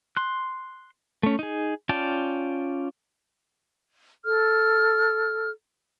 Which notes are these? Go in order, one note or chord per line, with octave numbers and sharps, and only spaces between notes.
C6 F#6
A3 C#4
D#4 G#4
C#4 F4 D5 G5 A5
A4 F6